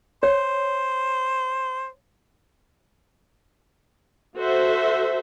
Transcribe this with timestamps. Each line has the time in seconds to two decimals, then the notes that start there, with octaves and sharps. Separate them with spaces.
0.23 C5 C#5
4.37 F#4 A4 C5 E5